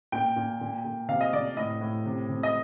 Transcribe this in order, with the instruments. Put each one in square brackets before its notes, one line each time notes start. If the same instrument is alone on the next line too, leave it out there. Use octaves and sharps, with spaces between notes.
[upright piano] A#2 G5
A#2
A#2
A#2
C3 F5
D#5
C3 D5
A2 D#5
A2
C3
C3
D#5